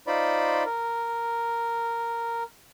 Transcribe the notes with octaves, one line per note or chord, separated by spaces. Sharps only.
D#4 F4 C5 D5 B5
A#4